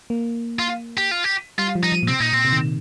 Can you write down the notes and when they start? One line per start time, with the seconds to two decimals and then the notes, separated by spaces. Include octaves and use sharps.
0.10 A#3
0.59 F4
0.97 G4
1.11 F4
1.24 G4
1.59 G3 F4
1.75 F3
1.83 D#4
1.92 F3
2.03 A#2
2.08 C3 C4
2.20 A#2 D#4
2.33 A#2 C4
2.45 C3
2.52 D#3
2.57 C3